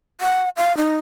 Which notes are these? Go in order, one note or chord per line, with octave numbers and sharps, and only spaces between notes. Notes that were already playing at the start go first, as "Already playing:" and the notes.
F#5
F5
D#4